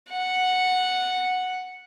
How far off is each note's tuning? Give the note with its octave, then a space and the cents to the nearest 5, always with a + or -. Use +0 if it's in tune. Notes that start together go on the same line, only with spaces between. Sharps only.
F#5 -5